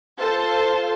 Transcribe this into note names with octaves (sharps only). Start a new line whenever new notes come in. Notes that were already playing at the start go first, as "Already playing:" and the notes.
F4 A4 C5 A5